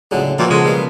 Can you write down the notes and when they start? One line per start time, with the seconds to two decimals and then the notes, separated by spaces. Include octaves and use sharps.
0.11 C#2 A2 D3 F#3 G#4
0.39 A#2 E3 F3 D4 F#4 E5
0.50 C#3 G#3 F#4 A4
0.65 B2 G3 A#3